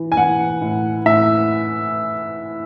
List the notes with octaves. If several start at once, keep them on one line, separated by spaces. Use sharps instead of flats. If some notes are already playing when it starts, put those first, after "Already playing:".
Already playing: E3
G#5
E3 F#5
A2
A2 E5